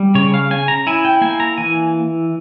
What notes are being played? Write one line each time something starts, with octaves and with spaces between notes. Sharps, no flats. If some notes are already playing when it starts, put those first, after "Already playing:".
Already playing: G3
C#3 C#5
F5
C#4 G#5
A#5
E4 G#5
G5
A#3 G#5
A#5
E3 G#5